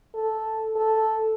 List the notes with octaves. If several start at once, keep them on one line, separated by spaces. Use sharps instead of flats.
A4
A4